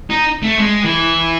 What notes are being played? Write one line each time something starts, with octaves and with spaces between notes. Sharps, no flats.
D#4
A3
G#3
E3